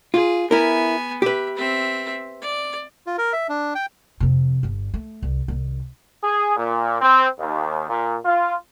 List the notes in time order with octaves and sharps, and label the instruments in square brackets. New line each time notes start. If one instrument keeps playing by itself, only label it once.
[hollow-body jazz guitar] F4 [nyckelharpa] G#4
[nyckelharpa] B3 G#5 [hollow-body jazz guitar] E4 A#4
[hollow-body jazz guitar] G4 B4 [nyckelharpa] E5
[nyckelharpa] C4 E5
D5
[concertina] F4
A#4
E5
D4
G5
[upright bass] F2 C3
G1 G2
A3
C2
C2 D#3
[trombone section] G#4
A#2
C4
D#2
A#2
F4